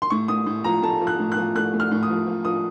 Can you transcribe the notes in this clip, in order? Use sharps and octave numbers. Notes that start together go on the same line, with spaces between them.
C6
A2 C#6
A2 D#6
A2
F3 A#5
A3 A5
F3
F#6
A2
F#6
F3
A3 F#6
A3
F6
A2
D#6
F3
F3
F3 D#6